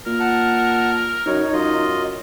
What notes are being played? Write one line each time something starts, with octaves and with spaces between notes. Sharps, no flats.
A#2 A#4
F#5 A5
F#2 D#4 C#5
F#2 F4 D#5